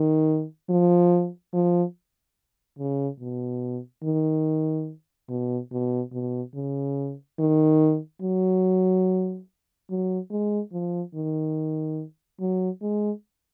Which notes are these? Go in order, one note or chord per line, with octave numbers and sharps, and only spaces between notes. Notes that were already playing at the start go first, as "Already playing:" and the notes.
Already playing: D#3
F3
F3
C#3
B2
D#3
B2
B2
B2
C#3
D#3
F#3
F#3
G#3
F3
D#3
F#3
G#3